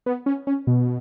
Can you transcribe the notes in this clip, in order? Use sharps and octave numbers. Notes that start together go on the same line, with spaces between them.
B3
C#4
C#4
B2